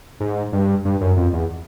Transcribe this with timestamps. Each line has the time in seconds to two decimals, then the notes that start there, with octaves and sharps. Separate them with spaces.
0.20 G#2
0.52 G2
0.85 G2
1.01 F#2
1.17 F2
1.33 E2